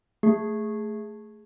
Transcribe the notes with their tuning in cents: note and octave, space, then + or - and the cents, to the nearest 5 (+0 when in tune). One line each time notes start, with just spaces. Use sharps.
A3 +0 G#4 +0